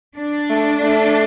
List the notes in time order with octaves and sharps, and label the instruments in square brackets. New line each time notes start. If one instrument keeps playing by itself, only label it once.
[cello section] D4
[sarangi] A3
A3